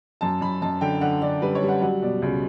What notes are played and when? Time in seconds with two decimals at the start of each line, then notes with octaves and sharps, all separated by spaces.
0.21 F#2 A5
0.41 F#2 B5
0.62 F#2 A5
0.81 D3 G5
1.01 D3 F#5
1.22 D3 D5
1.42 G3 B4
1.55 C#5
1.62 G3
1.69 F#5
1.82 F#3 F#5
2.02 B2 D5
2.22 C#2